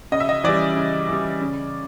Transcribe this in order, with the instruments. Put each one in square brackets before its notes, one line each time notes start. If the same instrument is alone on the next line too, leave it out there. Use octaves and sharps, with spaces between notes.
[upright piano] C#3 D#5
E5
D#5
E3 G3 D5
C#3
E3 G3
C#3